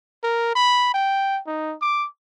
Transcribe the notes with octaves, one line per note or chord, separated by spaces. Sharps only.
A#4
B5
G5
D#4
D6